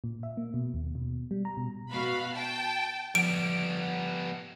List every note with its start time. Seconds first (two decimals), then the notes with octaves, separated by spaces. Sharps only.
0.04 A#2
0.23 E5
0.37 A#3
0.54 B2
0.74 D#2
0.95 B2
1.31 G3
1.45 A#5
1.57 B2
1.91 B2 F#4 F5 B5
2.34 G5 A5
3.15 F3 G3 B3 D7